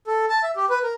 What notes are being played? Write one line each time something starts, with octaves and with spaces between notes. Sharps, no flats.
A4
A5
E5
G4
B4
A#4